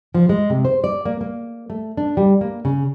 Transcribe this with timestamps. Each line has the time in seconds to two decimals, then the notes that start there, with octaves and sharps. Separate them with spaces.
0.14 F3
0.29 G#3
0.50 C3
0.65 C5
0.84 D5
1.05 A#3
1.21 A#3
1.70 A3
1.97 D4
2.17 G3
2.41 A#3
2.65 C#3